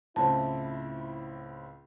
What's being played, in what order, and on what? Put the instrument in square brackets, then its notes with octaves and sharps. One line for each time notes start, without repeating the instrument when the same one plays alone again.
[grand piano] C#2 A2 C4 [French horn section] E4 [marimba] A5